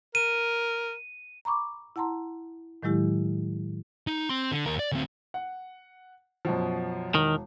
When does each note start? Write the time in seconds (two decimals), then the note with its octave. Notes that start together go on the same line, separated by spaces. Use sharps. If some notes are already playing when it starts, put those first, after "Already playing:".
0.15 A#4 D#7
1.45 A#5 B5 C#6 D6
1.96 E4 F#5 A5 A#5 C6
2.83 A2 D#3 F#3 G#3 E4 G4
4.07 D#4
4.29 C4 C6
4.52 D3
4.66 D#2 A#4
4.79 D5
4.92 D2 C4
5.34 F#5
6.45 F#2 B2 F3
7.15 E1 D#3